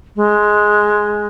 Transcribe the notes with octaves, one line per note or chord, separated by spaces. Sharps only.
G#3